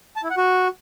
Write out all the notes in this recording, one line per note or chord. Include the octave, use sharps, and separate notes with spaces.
A5
E4
F#5
F#4